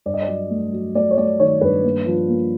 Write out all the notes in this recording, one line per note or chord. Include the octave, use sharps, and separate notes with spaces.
G2 D5
D#5
D5
F#3
A3
F#3
A3 D5
C#5
A3 D5
D#3 C#5
G2 B4
A#3
F3
A#3